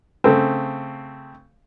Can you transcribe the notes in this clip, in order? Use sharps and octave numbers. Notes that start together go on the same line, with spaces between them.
C#3 A3 C4